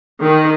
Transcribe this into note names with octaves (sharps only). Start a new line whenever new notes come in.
D#3